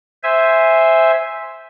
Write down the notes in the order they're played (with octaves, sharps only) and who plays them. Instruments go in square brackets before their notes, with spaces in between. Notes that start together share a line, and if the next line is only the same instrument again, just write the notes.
[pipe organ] C5 E5 G#5